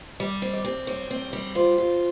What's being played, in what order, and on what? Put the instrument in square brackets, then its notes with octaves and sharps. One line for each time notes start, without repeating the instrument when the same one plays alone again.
[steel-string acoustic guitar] G3 [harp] D5
[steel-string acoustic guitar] C4
[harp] D5
[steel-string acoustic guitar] C4
[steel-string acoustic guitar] G3 [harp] C#5
[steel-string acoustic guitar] C4
G3
[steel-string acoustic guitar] F4 [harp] C5
[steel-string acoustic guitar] F4